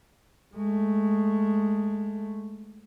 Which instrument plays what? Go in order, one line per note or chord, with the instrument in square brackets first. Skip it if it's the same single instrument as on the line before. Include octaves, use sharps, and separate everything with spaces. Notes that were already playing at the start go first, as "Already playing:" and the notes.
[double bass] G#3 A3